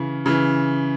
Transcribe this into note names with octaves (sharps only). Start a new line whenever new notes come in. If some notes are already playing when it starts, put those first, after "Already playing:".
Already playing: C#3 E3
C#3 E3